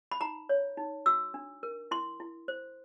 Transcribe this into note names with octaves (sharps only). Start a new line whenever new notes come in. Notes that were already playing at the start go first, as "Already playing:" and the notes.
B5
D#4 A#5
C#5
D#4
F#4 E6
D4
A#4
E4 C6
E4
C5